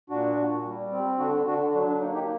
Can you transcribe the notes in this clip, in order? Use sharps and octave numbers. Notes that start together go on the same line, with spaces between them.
A#2 D4 F#4
A#2
G3
C4
D3 D4 F#4
D3 D4 F#4
F#3 D4
D4
A#3 D#4
D#4 G4